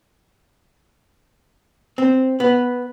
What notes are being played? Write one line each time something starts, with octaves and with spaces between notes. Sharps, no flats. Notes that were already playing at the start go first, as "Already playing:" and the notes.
C4
B3